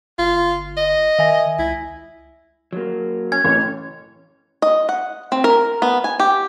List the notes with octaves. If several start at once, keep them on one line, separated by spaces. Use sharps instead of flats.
G1 F4
D#5
D#3 E5 G#5 A#6
C#2 E4
F#3 A#3
C#4 G#6
A1 C#5
D#5
F#5
C4
A#4
B3
G#5
G4